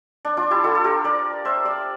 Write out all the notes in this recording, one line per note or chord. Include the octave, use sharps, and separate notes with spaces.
D4
D4 F4
E4 G4
F4 A4
A4
G4 A#4
A#4 D5
C5 E5
D5 F5